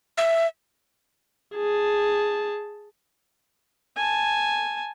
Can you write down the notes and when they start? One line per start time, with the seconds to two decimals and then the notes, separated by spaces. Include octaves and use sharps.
0.18 E5
1.55 G#4 A5
3.96 G#5 A5